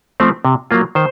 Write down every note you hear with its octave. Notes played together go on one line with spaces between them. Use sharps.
F3 A3 C4
C3
F#3 A#3 F4
D#3 C5